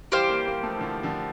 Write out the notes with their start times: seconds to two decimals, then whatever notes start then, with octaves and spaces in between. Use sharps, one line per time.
0.12 E3 G3 G4 C5 F5
0.29 G3 A#3
0.46 G3 A#3
0.63 F3 A3
0.76 E3
0.81 D3 F3
1.03 D3 F3